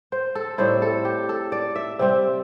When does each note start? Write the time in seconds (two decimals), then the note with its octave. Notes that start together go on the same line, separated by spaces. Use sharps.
0.12 C5
0.35 A4
0.58 A2 G3 C4 E4 C5
0.82 A4
1.05 G4
1.29 A4
1.52 D5
1.76 E5
1.99 C3 G3 C4 E5